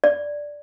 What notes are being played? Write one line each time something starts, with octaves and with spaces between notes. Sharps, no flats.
D5